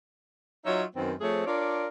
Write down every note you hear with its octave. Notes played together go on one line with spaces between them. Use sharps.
F#3 D#4 F4 C#5 D#5 E5
F#2 D#3 B3 C4
F3 A3 C4 G#4 C#5 E5
D4 F4 A#4 C#5 D5